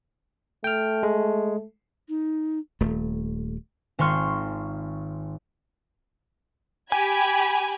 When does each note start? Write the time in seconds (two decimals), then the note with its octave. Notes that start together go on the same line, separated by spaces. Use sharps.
0.64 A3 G5 F6
1.03 G#3
2.08 D#4
2.80 D#1 A3
3.99 G#1 G#3 F4 C6 C#6 F6
6.92 G4 G#5 B5 G#6